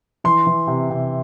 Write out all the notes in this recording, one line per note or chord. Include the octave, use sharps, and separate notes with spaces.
E3 C6
E3
C3
C3